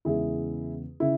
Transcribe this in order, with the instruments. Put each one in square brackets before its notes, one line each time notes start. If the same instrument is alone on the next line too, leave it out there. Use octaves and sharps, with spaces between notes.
[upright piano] E2 C#3 G#3 E4 G#4
C#3 E4